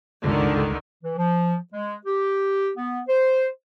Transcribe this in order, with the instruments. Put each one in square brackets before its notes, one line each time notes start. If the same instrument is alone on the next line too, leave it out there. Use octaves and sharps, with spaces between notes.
[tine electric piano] G1 C#2 [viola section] D3 D#3
[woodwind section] E3
F3
G#3
G4
B3
C5